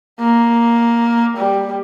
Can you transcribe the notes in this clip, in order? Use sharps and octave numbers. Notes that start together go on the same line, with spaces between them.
A#3
G3